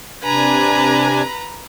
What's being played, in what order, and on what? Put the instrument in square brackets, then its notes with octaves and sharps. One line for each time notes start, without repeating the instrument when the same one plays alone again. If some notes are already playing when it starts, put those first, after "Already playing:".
[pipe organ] C3 D4 G#5 [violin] B4 A#5